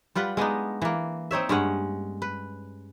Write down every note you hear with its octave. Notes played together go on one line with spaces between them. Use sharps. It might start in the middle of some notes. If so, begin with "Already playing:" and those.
G3 F4 B4 F#5
G#3 B3 D4 D#4
E3 A#3
C4 D#4 C#5 E5
G2 G#3 C#4 F#5
B4